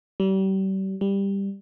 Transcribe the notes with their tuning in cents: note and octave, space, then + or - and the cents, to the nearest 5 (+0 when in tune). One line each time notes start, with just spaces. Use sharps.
G3 -35
G3 +10